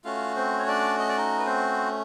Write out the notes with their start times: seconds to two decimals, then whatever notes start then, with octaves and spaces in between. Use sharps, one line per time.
0.04 A3 C#4 F4 F#4 F5
0.36 C4 C5
0.59 C#5
0.67 D4 D5
0.99 D#5
1.09 D5
1.17 D#4 D#5
1.39 B4
1.46 C4 C5